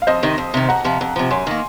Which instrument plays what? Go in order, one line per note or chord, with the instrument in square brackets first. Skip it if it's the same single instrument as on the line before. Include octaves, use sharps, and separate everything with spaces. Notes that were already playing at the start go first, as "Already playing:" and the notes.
[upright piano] F5
[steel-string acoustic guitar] F2 [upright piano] C5 D#5
[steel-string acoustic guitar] C3 D#3
F2
C3 D#3
[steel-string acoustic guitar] F2 [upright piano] F#5 A#5
[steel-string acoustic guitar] C3 F3
F2
C3 F3
[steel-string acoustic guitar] F#2 [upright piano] G#5 C6
[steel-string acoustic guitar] D#3 A#3